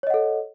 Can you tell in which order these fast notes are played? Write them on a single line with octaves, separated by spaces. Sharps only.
C#5 D#5 F#5 A4